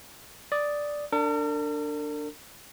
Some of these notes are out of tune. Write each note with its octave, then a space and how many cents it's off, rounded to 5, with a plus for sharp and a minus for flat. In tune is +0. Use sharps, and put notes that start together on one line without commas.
D5 +0 D#6 +0
D4 +0 A#4 -45